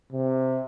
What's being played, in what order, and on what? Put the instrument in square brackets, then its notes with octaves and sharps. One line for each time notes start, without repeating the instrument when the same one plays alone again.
[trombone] C3